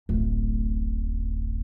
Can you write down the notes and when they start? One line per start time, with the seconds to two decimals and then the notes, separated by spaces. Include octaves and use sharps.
0.09 D1 A1